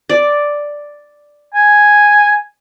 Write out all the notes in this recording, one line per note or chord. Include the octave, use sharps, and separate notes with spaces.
D5
G#5